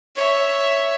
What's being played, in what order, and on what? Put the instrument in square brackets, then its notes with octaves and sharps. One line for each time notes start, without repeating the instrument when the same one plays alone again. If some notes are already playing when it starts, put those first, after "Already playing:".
[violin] C#5 E5